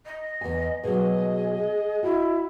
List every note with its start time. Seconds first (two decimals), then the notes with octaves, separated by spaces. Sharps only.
0.06 D#5
0.41 E2 G#5
0.84 B2 F#3 G#4 D#5
2.03 E4 F#4